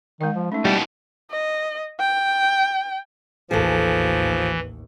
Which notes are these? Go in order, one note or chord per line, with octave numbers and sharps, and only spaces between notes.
D#3 G#3 D#5
F3
A3 C#4 D#4
D#2 B2 G3 E4
D#5
G5
A1 D#2 E3 F3 G#4 A4